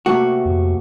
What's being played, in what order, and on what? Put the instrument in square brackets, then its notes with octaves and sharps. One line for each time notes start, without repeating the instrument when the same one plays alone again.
[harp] C3 A3 A#3 [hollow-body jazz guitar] F#4
[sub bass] F2